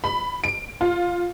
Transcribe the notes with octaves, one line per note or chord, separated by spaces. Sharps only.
B5
D7
F4